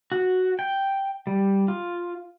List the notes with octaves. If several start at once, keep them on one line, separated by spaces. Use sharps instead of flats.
F#4
G5
G3
F4